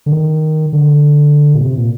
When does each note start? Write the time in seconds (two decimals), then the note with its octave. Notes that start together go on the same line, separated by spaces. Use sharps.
0.06 D3
0.12 D#3
0.73 D3
1.55 A#2
1.61 C3
1.77 A#2